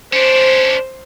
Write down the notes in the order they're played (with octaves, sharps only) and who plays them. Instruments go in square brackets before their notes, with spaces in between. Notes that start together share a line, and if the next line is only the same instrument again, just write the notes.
[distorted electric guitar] C#4 D4 [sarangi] C5